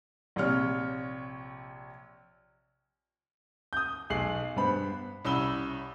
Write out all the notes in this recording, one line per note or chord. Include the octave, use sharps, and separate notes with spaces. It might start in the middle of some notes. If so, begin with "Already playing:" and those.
A#1 C3 C#5 F6
D#6 G6
B1 G#4 C7 F#7
G2 B3 C5 B5
C2 C#4 B5 E6 G7